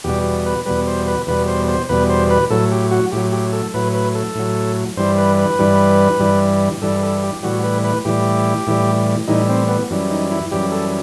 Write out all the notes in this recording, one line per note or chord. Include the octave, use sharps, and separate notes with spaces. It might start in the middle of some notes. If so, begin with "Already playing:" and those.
E2 B2 G3 G4
B4
E2 B2 G3 B4
C5
B4
E2 B2 G3 B4
C5
C5
E2 B2 G3 B4
C5
B4
A2 F#3 A4
G4
F#4
A2 F#3 G4
G4
A4
A2 F#3 B4
B4
A4
A2 F#3
G2 E3 G3 C5
B4
B4
G2 E3 G3
G2 E3 G3
G2 E3 G3 A4
A4
G4
A2 E3 G3 F#4
B4
B4
A2 E3 G3 G4
A2 E3 G3
A2 E3 G3 D#4
C4
B3
F#2 E3 G3
D#4
E4
F#2 E3 G3 G4
A4